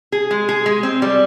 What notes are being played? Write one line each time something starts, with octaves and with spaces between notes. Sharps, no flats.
G#4
G#3
G#4
G#3
C4
G3